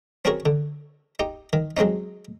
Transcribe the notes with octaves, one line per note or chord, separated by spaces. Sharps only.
C4 C#4 F#4 G#4 A#4 C#5
D3
D#4 G4
D#3
F#3 G#3 C4 C#4 D#4